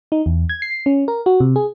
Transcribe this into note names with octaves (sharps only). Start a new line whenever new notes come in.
D#4
E2
G#6
C7
C#4
A#4
F#4
C3
G#4